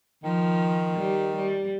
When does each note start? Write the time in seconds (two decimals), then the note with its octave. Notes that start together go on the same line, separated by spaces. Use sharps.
0.24 D#3 F3
0.98 G3
1.35 G3